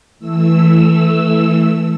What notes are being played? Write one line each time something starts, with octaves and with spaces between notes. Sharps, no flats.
E3 A3 E6